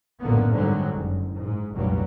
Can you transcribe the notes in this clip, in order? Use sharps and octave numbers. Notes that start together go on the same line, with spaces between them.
A#1 F#2 A2 D3 A#3 B3
G#1 G#2 D3 F#3 G3
F#1
G#2
F1 B1 G2 A#2 F#3 G3